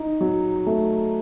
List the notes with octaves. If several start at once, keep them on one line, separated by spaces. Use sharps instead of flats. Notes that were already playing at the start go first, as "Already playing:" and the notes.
Already playing: D#4
F#3
A3